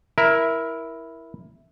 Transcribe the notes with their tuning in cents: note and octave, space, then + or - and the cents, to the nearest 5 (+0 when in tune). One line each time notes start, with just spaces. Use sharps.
E4 +0 A#4 +15